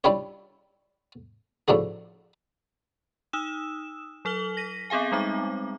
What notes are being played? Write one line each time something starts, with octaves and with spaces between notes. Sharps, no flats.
G3 D4 E4 F4 G4 C#5
A2 F3 D4 F#4 G#4
D#4 D#6 E6 E7
F#3 A4 F6 F#7 G7
A#6 B6 D#7
B3 C4 G#4 F5 G#5
G3 G#3 C4 D#4 D6